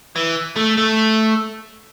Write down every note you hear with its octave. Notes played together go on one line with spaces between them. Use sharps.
E3
A3
A3